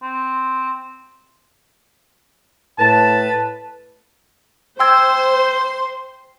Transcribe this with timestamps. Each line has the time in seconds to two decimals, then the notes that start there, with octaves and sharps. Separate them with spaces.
0.02 C4
2.79 A2 B4 A5
4.80 C5 G5 C6 E6 G#6